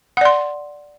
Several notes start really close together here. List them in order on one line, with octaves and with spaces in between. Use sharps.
F#5 D5 C6